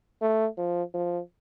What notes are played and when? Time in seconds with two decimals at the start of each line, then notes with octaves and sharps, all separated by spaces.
0.22 A3
0.58 F3
0.94 F3